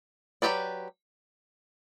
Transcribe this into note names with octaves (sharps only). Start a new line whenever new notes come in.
F#3 C4 G4 B4 D5